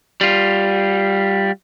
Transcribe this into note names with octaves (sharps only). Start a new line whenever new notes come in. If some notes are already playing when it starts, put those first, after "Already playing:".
G3 F4